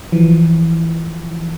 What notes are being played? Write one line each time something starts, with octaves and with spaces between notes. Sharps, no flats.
E3 F3